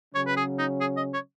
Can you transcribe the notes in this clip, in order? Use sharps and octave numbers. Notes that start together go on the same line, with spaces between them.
C#3 F#3 C#4 C#5
B4
G#4
D#4
G#4
D#5
C#5